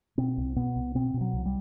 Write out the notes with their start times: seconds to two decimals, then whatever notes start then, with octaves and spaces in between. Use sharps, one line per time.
0.18 B2 C4
0.37 C2
0.56 B2 B3
0.76 C2
0.95 B2 C4
1.14 B2
1.21 F#3
1.33 C2
1.46 G3